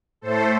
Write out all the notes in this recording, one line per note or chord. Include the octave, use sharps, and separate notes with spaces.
A2 A3 A4 C5